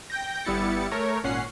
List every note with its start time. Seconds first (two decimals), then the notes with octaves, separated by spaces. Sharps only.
0.10 G5 G6 A#6
0.45 G1 G3 B3 E4 A6 C#7
0.92 A3 A#4 C#5
1.24 G#1 A#2 C#4 F#5 C7